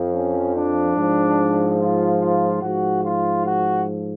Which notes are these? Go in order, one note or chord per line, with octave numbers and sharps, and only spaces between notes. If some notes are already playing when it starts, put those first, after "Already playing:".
Already playing: F2 F3
C#4
D4
G#2 F3
F4
F4
G#2 F3 F#4
F4
F#4